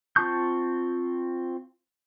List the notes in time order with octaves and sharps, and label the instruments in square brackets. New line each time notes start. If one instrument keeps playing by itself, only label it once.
[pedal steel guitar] C4 F4 A5 C#6 G6